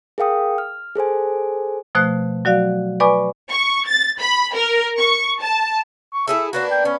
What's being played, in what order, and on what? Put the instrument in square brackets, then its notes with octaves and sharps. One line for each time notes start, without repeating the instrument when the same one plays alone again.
[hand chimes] G#4 A#4 F5 G5 D#6
F6
G#4 A4 C5 G#5
[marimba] B2 F3 A3 C5 F#6
F#3 F#4 D5 F5
B4 D5 G#5 B5 C#6 D6
[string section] C#6
A6
B5
A#4
C#6
A5
[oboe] C#6
[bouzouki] E4 G#4 A4 [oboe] E5
[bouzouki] A#3 B3 D4 [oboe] F#4
[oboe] G5
[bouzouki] B3 [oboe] C#4